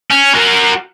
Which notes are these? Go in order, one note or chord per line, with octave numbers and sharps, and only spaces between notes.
C#4
F#4 A#4